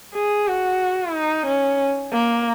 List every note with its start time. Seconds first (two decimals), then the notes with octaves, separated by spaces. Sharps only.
0.14 G#4
0.48 F#4
1.14 D#4
1.47 C#4
2.13 A#3